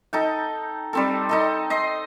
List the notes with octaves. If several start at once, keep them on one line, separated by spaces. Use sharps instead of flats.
D#4 A4 G5
G3 C4 A4
D#4 A4 D#5
D#5 C6